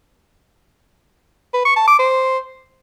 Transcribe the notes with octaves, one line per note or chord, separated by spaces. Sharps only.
B4
C#6
A5
D6
C5